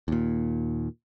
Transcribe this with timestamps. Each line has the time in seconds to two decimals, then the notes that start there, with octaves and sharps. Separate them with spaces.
0.08 D#2 A#2